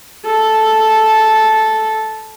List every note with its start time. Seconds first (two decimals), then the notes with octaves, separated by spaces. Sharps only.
0.26 A4